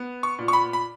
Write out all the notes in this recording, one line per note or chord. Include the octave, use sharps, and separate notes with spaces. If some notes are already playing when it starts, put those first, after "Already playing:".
Already playing: B3
C#6
A#2
C#6
B5
B5